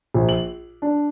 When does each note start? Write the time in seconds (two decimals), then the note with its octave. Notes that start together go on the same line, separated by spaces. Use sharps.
0.14 A#1
0.29 F#7
0.82 D4